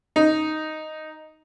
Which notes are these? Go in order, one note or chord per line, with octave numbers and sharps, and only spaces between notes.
D#4